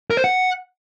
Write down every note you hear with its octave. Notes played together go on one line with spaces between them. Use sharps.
A#4
C5
F#5